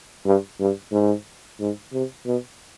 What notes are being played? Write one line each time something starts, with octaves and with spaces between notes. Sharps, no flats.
G2
G2
G#2
G#2
C3
B2